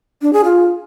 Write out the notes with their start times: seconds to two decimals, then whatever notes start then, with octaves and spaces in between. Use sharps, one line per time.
0.22 D4
0.33 G#4
0.44 F4